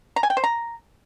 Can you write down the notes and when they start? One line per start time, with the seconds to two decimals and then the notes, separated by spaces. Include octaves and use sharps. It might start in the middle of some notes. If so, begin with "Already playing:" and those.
0.16 A#5
0.23 G#5
0.30 G5
0.37 C5
0.44 A#5